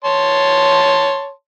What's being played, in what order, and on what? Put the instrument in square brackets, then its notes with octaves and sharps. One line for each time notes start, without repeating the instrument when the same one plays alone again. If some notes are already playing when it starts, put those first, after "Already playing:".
[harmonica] C#5 A5 C6